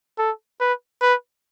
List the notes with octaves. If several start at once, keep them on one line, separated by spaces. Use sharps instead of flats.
A4
B4
B4